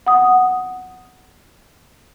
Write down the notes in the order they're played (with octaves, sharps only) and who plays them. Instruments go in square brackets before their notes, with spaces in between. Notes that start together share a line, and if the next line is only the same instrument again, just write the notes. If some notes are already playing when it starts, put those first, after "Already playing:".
[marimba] F#5 D#6